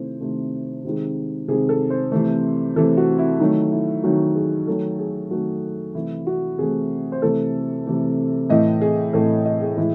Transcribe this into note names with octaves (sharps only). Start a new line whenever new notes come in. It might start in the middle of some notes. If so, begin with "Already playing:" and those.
Already playing: C3 D#3 A3 E4 C5
C3 D#3 A3
C3 D#3 G#3
C3 D#3 G#3 G#4
A4
C5
C3 E3 A3
C3 E3 A3 A4
F#4
E4
D#3 F#3 A3 D#4
E4
D#3 F#3 A3 F#4
G#4
D#3 F#3 A3 A4
G#4
D#3 F#3 A3 F#4
C3 E3 A3 E4
F#4
C3 E3 A3 G#4
C5
C3 E3 A3 A4
C3 E3 A3
A2 E3 A3 D#5
G#4
A2 E3 A3 A4
D#5
G#4
A2 E3 G#3 E4